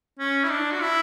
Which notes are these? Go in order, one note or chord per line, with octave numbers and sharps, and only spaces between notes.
C#4
E4
D4
F#4
E4